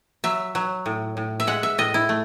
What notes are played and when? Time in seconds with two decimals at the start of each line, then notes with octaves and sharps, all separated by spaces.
0.24 F#3 E5
0.55 F#3
0.86 A2
1.17 A2
1.40 E5
1.47 G#3 F#5
1.63 E5
1.78 A2 D#5
1.94 E4
2.09 A3